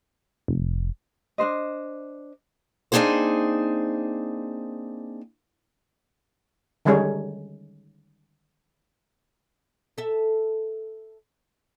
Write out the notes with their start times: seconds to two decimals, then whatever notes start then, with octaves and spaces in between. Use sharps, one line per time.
0.48 F1
1.38 D4 D#4 C5 D#5
2.92 A#3 C4 D4 D#4 G#4 C5
6.85 D3 D#3 G3 G#3 C#4 D#4
9.98 A4 E5